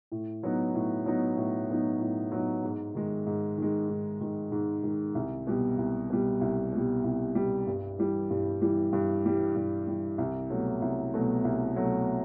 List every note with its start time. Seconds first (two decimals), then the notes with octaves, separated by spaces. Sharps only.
0.12 A2
0.43 F#3 B3 D#4
0.75 A2
1.06 F#3 B3 D#4
1.37 A2
1.69 F#3 B3 D#4
2.01 A2
2.32 F#3 B3 D#4
2.63 G#2
2.95 D#3 G#3
3.26 G#2
3.58 D#3 G#3
3.89 G#2
4.21 D#3 G#3
4.52 G#2
4.83 D#3 G#3
5.15 C2
5.47 B2 G3
5.78 C2
6.10 B2 G3
6.41 C2
6.73 B2 G3
7.04 C2
7.35 B2 G3
7.67 G2
7.99 E3 G3
8.31 G2
8.61 E3 G3
8.93 G2
9.25 E3 G3
9.56 G2
9.87 E3 G3
10.18 C2
10.50 B2 F#3 A3
10.82 C2
11.13 B2 F#3 A3
11.45 C2
11.76 B2 F#3 A3